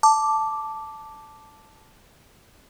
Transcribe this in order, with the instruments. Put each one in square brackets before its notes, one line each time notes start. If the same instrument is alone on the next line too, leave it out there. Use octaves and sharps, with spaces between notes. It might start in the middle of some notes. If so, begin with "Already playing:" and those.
[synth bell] A5 D6